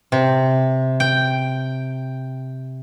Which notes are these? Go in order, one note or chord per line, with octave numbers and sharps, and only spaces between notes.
C3
G5